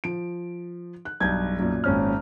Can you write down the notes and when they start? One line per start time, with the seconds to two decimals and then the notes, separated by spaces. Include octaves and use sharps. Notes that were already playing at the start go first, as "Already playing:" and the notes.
0.04 F3 D7
1.05 F#6
1.20 B1 G2 G6 G#6
1.59 F#2 A#2
1.84 G#1 C#4 F6